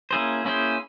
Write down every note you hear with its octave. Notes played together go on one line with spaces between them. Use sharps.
A#3 C#4 E4 G#4 C5
A#3 C#4 E4 G#4 C5